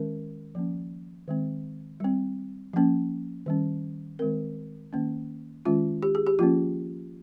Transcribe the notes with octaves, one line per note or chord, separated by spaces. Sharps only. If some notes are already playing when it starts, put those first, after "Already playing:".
Already playing: D#3 G#3 C#4 A#4
F3 A#3 C#4
D#3 G#3 C4
G3 C4
F3 A#3 C#4
D#3 G3 C#4
D#3 G#3 C4 A#4
D#3 A#3 C#4
D#3 G#3 C#4 F4
G4
G#4
G4
F3 A#3 C#4 F4